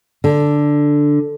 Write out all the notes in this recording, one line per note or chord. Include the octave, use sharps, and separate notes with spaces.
D3